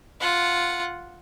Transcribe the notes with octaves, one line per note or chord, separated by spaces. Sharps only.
F4 F#5